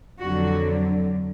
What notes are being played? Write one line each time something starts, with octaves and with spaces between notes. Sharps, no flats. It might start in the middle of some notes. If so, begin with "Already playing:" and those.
F2 D3 F#3 F#4